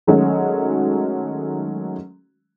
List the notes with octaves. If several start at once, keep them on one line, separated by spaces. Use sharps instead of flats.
D#3 F#3 G#3 A3 C#4 F#4